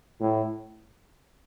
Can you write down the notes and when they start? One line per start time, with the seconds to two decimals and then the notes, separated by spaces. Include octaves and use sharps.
0.20 A2